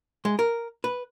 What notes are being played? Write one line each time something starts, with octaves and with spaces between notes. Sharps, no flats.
G#3
A#4
B4